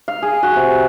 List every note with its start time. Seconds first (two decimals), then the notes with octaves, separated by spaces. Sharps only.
0.08 F5
0.22 G#4
0.43 F#4
0.56 C3